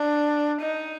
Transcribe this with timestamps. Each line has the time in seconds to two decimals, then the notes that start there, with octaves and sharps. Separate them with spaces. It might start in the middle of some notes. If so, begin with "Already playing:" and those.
Already playing: D4
0.61 D#4